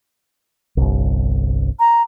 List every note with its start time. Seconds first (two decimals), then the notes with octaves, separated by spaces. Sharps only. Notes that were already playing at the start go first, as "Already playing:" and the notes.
0.77 G1 C2
1.80 A#5